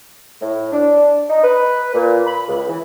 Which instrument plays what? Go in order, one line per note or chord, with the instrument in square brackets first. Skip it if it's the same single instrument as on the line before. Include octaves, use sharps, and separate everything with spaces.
[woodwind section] A2
D4
D#4
B4
A#2
B5
C#2
E3